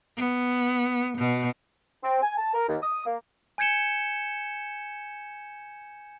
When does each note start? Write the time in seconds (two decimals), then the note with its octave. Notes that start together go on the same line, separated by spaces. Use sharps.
0.17 B3
1.18 B2
2.03 C4
2.22 G#5
2.37 A5
2.54 A#4
2.68 D#2
2.82 D#6
3.06 A#3
3.58 G#5 G6 G#6 C#7 E7 G7